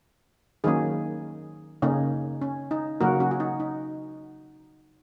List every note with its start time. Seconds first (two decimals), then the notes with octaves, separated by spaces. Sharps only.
0.64 D#3 F#3 A#3 C#4 D#4 G#4
1.82 C#3 A#3 C#4 D#4
2.42 C#4
2.71 D#4
3.01 C#3 F#3 A#3 F#4 A#4
3.20 C#4 F#4
3.31 F#4
3.40 D#4
3.60 D#4